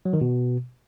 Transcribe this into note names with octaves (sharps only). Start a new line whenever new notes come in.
F#3
D#3
B2